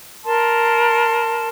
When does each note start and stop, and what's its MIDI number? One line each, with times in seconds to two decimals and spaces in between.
0.24 1.48 70
0.24 1.48 81
0.24 1.48 84